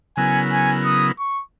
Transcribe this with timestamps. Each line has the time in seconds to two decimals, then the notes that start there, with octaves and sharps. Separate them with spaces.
0.17 C#3 F#3 B3 E4 A#4 G#5
0.51 G#5
0.85 D#6
1.19 C#6